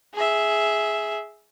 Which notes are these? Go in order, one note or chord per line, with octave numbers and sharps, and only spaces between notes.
G#4 E5